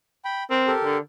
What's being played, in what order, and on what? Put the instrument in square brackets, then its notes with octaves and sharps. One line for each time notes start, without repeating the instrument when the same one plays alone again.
[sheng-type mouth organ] G5 B5
[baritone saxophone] C4 [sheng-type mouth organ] A#4
[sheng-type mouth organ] G4 A4 A#4
[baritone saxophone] D3